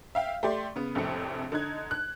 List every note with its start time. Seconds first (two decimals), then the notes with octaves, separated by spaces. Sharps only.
0.15 E5 F5 G5
0.43 A3 G4 D5 C6
0.76 C#3 B3
0.95 A#1 F2 A2 C3 C#7
1.52 D3 D#4 F#6 G#6
1.91 F#6